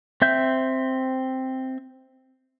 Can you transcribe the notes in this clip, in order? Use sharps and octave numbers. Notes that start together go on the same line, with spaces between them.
C4 E5 G6